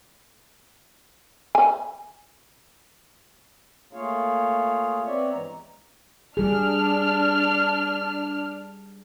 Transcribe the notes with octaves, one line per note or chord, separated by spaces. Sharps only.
G#5
A3 A#3 F4 G#4 C#5 F5
B3 C4 C#5 D5 E5
G2 E3 G#3 A#5
G3 D4 G#4 F6